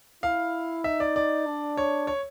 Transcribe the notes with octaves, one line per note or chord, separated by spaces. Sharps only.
E4 F5
D#4 E5
D5
D5
D4
C#5
C#5